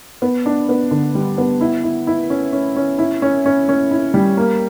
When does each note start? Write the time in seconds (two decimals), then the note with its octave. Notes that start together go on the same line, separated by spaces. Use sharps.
0.22 B3
0.46 D4
0.69 B3
0.91 D3
1.15 G3
1.38 B3
1.61 E4
1.83 E4
2.07 E4
2.30 C#4
2.53 C#4
2.76 C#4
2.98 E4
3.22 C#4
3.46 C#4
3.69 C#4
3.91 E4
4.14 G3
4.37 A#3